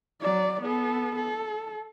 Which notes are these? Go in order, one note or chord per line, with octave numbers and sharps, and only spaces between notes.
F#3 D5
B3 A4
A4